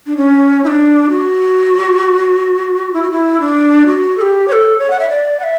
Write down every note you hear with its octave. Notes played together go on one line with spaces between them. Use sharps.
D4
C#4
E4
D4
F#4
E4
F#4
E4
D4
F#4
A4
G4
C#5
A4
C#5
F#5
E5
D5
F#5
E5